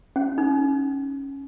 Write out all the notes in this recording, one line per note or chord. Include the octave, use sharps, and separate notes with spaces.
C#4
D#4